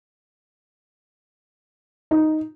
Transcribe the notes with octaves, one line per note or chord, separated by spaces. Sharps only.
D#4